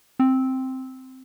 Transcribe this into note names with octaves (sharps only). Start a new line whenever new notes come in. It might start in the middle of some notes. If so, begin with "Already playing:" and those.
C4